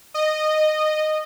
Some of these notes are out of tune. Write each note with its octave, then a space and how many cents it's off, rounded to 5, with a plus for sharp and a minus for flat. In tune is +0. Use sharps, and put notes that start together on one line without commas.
D#5 -15